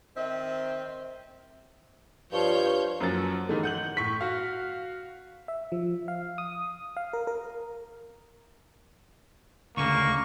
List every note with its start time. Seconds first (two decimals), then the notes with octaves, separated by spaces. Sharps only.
0.17 D#3 C4 E5
2.32 G2 F3 C#5 G6
3.01 F#2 F3 A#3 C#4 F#4 A6
3.49 G#2 D#3 E3 G#3 A3
3.63 F#5 G6 F#7
3.97 A2 C#6 B6
4.21 F#4 F5
5.48 E5
5.72 F3
6.08 F5
6.38 D#6
6.97 F5
7.13 A#4
7.27 A#4
9.77 D2 C#3 A#3 C#6